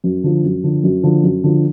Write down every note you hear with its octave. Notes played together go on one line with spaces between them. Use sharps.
F#2
D3 F3
F#2
D3 F3
F#2
D3 F3
F#2
D3 F3